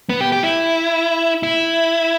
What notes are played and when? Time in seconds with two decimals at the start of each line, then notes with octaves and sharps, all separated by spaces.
0.09 B3
0.21 G4
0.32 G4
0.43 E4
1.43 E4